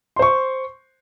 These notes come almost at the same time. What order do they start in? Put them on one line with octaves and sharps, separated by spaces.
C6 C5 C#6